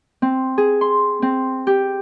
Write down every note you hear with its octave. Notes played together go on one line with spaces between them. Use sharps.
C4
G#4
C6
C4
G4